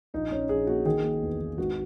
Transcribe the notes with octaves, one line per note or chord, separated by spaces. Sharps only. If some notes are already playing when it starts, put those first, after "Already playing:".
A#1 D#4
A#1 C#4
A#1 G#4
A#3 F#4
D#3 G#4
A#3
E2
D#3
G#1 F#4